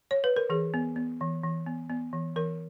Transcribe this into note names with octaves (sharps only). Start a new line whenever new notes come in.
C#5
B4
A#4
E3 G#4
B3
B3
E3
E3
B3
B3
E3
E3 A#4